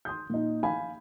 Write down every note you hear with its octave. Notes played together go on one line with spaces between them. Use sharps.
C6 D#6 G6
A#2 D#4
F5 G#5 B5